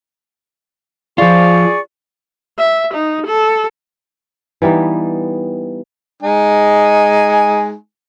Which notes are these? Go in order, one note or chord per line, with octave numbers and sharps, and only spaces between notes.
F3 F4 G#4 D5 C#6
E5
D#4
A4
E3 G3 B3 D#4
G#3 D#4 G#5